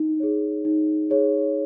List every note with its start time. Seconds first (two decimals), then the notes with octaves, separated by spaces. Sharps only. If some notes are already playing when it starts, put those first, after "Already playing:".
Already playing: D#4
0.20 G#4 C#5
0.65 D#4
1.10 G#4 C#5